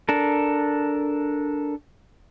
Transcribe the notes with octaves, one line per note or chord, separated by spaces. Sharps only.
D4 A4 A#4